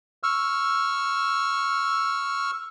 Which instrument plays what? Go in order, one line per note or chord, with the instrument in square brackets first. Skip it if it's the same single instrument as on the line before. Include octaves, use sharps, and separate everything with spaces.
[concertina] C#6 E6 F6